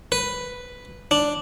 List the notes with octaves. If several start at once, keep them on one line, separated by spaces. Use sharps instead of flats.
B4
D4